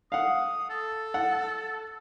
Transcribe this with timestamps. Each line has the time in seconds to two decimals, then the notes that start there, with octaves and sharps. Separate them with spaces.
0.12 F5 F#5 D#6
0.70 A4
1.14 F#5